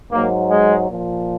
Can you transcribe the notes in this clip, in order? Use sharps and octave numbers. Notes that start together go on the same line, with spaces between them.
G#2 F#3 A#3
G#3
A#2 F3